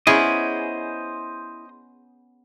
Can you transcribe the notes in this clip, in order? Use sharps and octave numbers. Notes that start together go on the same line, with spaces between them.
B3 C#4 E4 G#4 C5 D#5